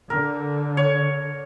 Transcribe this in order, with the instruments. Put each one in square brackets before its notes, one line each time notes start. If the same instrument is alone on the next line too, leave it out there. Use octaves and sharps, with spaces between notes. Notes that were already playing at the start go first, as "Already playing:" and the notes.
[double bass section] D3 [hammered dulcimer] A#4
[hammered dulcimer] C#5